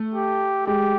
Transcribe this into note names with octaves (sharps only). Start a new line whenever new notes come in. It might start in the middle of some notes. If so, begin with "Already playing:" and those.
Already playing: A3
G4
G#3 G4